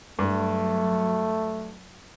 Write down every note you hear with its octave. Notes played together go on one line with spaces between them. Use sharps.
G2 F#3 A3